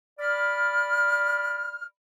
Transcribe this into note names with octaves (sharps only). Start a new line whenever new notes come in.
D5 B5 F6